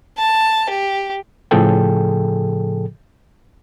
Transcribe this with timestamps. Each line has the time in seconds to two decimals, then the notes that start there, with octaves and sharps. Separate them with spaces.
0.18 A5
0.70 G4
1.51 A2 C#3 F3 G#4 A4 G5